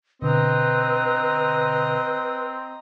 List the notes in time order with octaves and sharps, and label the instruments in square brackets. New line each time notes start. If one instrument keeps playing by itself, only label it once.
[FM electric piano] B2 D3 [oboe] C4 [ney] B4 [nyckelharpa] D#5 A#5